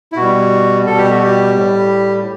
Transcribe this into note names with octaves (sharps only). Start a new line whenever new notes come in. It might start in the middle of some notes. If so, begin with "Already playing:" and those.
E4
B2 G3 F#4
B2 G3 A4
G4
F#4
G4
A2 G3